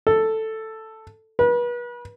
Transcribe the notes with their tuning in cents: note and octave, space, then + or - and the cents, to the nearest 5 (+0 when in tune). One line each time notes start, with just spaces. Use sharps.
A4 +5
B4 -35